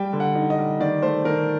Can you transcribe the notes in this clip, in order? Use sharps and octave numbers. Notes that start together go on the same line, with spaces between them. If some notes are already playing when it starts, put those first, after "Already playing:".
Already playing: G3 G5
D3
F#5
D#4
D#5
G3
D#3 D5
A3 C5
D#3 A#4